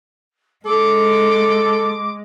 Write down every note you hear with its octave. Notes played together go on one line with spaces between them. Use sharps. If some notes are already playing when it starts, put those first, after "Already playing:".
G#3 A4 D6